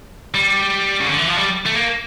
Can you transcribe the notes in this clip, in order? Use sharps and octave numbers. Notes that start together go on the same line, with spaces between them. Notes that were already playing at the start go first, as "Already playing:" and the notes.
G3
C#3
D3
E3
F3
G3
A3
A#3